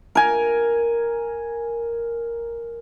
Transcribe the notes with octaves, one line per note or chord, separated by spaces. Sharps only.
A#4 G#5